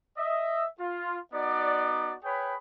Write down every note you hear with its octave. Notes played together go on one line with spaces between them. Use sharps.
D#5 E5
F4
B3 D#4 F#4 D5
G#4 B4 C#5 G5 B5